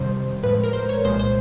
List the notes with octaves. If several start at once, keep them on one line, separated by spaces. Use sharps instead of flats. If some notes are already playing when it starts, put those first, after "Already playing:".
Already playing: F2 C3 D#3 G3 C5
A2 F3 G#3 B4
A#4
C5
C#5
C2 A#2 F3 G#3 C5
C5